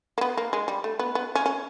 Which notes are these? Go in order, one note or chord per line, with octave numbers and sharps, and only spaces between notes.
A#3
B3
A#3
G#3
G3
A3
B3
B3
C#4
C#4